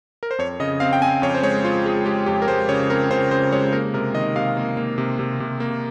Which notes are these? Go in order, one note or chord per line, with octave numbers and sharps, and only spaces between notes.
A#4
C5
F2 C#5
C#3 D#5
C4 F5
G5
C4 G#5
F2 C#5
C5
G#3 C#5
C4 F4
G#3 G#4
G#3 G4
F2 G4
A#4
G#3 C5
C#3 C#5
C4 A#4
C#3 C5
C#3 C5
G#3 C#5
A#3 A#4
C3 A#4
D#3 D#5
C3 F5
A#3
A#3
C3
C3
C3
A#3